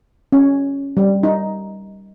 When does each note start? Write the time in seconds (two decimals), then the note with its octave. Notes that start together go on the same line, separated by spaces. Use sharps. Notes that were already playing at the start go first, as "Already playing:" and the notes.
0.32 C#4
0.97 G3
1.23 D#4